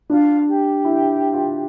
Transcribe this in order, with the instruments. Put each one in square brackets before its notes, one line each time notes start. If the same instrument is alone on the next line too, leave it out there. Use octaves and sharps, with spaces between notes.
[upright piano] D4 [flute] F4
[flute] G4
[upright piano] E4
F4